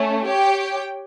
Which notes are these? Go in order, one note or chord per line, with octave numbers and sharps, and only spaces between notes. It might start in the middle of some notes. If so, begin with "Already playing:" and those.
Already playing: A3 C#4
G4 C#5 G5